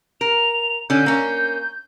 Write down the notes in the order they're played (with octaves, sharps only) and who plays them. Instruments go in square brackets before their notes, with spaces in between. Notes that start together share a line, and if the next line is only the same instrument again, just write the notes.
[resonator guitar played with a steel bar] A#4 [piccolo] F7
[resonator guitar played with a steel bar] D3 C#4 [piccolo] G6
[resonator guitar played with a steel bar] A#3 C#4